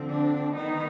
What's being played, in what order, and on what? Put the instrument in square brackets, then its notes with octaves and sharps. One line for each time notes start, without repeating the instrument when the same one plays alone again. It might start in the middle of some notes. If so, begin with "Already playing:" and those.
Already playing: [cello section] D3 F3 C4
D4
D#3 B3 D#4